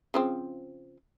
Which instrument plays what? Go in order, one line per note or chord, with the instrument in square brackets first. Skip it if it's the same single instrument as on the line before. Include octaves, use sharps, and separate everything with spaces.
[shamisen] C#3 F3 C4